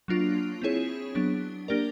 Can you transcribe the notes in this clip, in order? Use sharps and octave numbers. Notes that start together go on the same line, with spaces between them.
F#3 A#3 D4 F4
C4 E4 G#4 C#5
F#3 B3 D4
A#3 D4 G4 A#4 D5